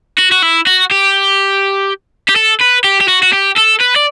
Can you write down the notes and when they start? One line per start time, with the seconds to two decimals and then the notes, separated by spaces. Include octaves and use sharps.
0.18 F#4
0.32 F#4
0.42 E4
0.67 F#4
0.91 G4
2.29 G4
2.36 A4
2.60 B4
2.84 G4
3.01 G4
3.08 F#4
3.23 F#4
3.33 G4
3.57 A4
3.80 B4
3.96 D5